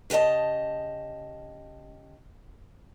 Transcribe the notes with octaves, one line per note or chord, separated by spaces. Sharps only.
C#3 G4 A4 D#5 A5